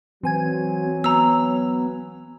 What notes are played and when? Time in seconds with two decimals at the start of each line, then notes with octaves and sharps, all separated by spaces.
0.23 E3 F#3 C4 G#5 G#6
1.04 B3 A#5 E6